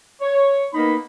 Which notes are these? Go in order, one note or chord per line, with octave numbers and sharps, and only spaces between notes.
C#5
A#3 B3 D#4 B5